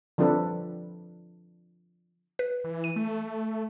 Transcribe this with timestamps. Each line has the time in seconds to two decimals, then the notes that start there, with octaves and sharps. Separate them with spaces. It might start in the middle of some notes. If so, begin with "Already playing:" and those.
0.18 D3 F3 C4 D4 A4 B4
2.39 B4
2.64 E3
2.84 D#7
2.96 A3